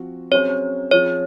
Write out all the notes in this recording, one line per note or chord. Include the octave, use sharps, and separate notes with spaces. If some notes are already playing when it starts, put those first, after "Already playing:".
Already playing: F3 C4 F#4
C3 F#3 C#4 G#4 C5 C#5
F3 C4 F4 G#4 C#5